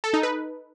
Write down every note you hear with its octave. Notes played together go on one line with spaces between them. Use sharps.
A4
D#4
B4